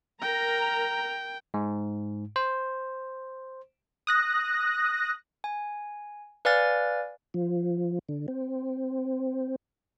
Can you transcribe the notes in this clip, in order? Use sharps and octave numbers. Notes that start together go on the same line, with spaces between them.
A#4 G5 A#5
G#2
C5
D#6 F#6 A#6
G#5
B4 D5 F5 G#5 F6 A6
F3
D3
C4